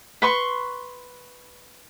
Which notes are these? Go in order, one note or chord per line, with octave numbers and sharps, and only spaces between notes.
B4 C6 C#6